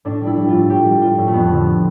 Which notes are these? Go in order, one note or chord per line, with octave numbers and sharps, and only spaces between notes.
A2 D4
G3
E4
G3
F4
A2
A2 G4
G3
G3 F4
A2
A3
F2 B3
D3